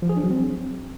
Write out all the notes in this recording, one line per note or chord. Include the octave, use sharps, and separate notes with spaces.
F3
G#4
D4
F#3
C4